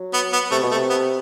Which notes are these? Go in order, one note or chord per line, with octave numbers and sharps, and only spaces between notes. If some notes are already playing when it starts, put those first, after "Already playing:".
Already playing: F#3
B3
B3
C3 A3
B2
C3 A3
B3